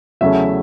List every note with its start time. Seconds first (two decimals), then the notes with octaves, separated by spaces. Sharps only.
0.21 E2 C#3 F#3 A3 C#4 E5